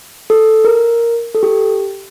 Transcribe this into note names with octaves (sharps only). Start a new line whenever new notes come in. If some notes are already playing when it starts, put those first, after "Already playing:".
A4
A#4
A4
G4